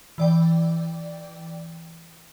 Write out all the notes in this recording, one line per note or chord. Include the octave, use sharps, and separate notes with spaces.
E3 D5 G5